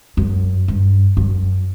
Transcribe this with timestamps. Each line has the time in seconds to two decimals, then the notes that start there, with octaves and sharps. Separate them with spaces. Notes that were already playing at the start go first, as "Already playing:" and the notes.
0.17 F#2
0.68 G2
1.17 F#2